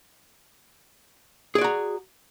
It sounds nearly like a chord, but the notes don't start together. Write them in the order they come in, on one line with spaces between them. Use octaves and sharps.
G#4 D5 F#4 A#5